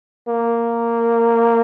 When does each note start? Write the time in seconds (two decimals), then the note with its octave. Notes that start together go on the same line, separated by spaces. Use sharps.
0.28 A#3